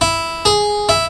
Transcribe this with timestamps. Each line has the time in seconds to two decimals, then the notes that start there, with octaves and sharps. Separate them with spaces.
0.01 E4
0.45 G#4
0.89 E4